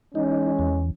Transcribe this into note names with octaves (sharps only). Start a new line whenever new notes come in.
E3 G#3 C#4 D#4
E2